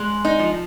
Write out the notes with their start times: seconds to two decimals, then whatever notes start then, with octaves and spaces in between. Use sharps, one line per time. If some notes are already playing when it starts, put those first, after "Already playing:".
Already playing: G#3
0.25 D#4
0.39 F3